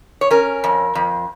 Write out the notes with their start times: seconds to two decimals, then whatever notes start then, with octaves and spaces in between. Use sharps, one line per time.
0.21 C#5
0.31 C#4 A#4
0.64 F2
0.95 F2